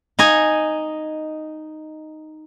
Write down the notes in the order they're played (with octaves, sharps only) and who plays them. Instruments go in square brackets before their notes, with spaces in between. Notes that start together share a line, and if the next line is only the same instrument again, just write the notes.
[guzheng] D#4 D#5 G#5